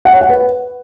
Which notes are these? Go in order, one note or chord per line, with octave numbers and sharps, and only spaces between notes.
F#5
C#5
F#5
B4